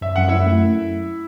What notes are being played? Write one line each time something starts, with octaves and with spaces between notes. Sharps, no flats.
F#2 E5
F#2 F#5
F#2 E4 E5
A3